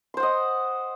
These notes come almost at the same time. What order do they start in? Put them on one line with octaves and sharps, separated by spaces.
C6 C5 F#5 D#5